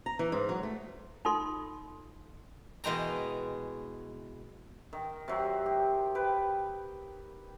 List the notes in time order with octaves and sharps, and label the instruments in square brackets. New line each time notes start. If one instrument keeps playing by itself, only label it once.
[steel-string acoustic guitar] A#5
E3
G#2
F#3
A3
[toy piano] D#4 F4 A4 C6
[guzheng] B2 E3 G#3 G5 A#5
[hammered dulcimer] D#3
C3 F#3
G4
B4 G5